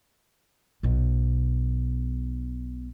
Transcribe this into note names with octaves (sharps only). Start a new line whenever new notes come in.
B1 B2